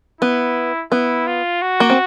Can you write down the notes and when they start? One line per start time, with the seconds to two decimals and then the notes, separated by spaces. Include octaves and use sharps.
0.21 B3 E4
0.92 B3 E4
1.27 F4
1.62 F#4
1.80 A#3
1.90 C4